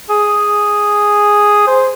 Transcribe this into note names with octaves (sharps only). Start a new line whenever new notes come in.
G#4
C5